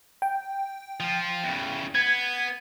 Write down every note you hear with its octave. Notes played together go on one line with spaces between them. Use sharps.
G5
F3 F4
E2 C#3
B3 G#6